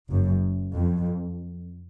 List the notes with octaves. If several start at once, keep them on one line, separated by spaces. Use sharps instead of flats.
F#1 F#2
F2